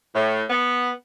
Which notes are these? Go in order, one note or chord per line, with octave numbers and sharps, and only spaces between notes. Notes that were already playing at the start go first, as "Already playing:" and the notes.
A2
B3